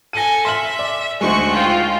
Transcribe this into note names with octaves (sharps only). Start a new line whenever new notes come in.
A4 G#5 A#6 D#7
E5 C6 F6 F#7
D5
D2 G#3 D#4 F#4 C5 C#6
F4 G5